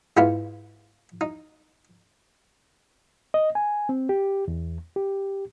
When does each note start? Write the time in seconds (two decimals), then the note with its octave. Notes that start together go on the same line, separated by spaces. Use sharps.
0.17 G#2 G#3 B3 E4 F4
1.21 D#4
3.34 D#5
3.55 G#5
3.89 C4
4.09 G4
4.48 E2
4.96 G4